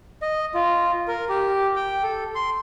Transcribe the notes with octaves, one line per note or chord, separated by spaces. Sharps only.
D#5
F4
A#4
G4
G5
A4
C6